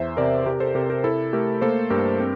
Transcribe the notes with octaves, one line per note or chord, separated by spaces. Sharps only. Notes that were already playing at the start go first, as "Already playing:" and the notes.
Already playing: E2 C5 E5
C3 A#4 D5
C3 G4 A#4
A4 C5
C3 G4 A#4
G4 A#4
E4 A4
A3 G4 A#4
A#3 A4 C5
G2 G4 A#4
C4